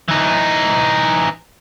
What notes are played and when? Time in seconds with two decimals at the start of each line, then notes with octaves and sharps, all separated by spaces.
0.08 E3 D#4